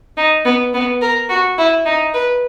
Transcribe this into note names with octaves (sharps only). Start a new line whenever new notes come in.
D#4
B3
B3
A#4
F#4
E4
D#4
B4